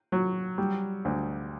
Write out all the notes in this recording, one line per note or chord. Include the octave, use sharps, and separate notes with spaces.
F#3
G3
D2